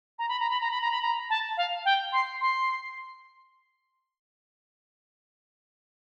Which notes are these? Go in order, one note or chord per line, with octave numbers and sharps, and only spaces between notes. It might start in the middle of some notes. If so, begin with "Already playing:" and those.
A#5
B5
A#5
B5
A#5
B5
A#5
B5
A#5
A5
F5
G5
C6
C6